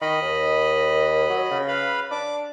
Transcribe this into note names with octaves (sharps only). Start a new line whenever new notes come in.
D#3 D#5 B5
D#2
F#3
C#3
B4 F5 B5
D4 D6